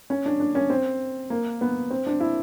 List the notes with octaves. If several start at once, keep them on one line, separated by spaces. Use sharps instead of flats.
C#4
D4
D4
C#4
C4
A#3
B3
C4
D4
E4